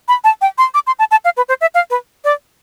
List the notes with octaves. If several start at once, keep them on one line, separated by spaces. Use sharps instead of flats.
B5
A5
G5
C6
D6
C6
A5
A5
F5
B4
C5
E5
F5
B4
D5